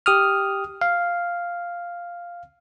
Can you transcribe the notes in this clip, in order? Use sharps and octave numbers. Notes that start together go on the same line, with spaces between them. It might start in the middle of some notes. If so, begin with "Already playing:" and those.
G4 D#6 F6
F5